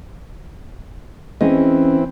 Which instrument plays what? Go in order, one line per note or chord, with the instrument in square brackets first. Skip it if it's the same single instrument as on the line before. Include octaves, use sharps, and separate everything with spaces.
[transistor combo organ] E3 C4 [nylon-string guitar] C#4 G#4 D#5